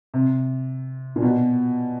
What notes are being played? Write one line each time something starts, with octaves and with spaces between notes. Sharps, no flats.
C3
A#2
B2